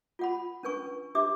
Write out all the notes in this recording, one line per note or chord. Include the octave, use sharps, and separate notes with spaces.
F4 F#5 B5
C#4 D4 B4 G#5 C#6
D4 G4 E5 D6